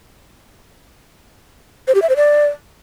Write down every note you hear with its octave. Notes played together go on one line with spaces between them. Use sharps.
C5
G4
E5
C5
D5